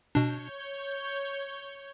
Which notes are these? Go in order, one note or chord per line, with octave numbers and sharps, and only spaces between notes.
B2 D4 C#5 G6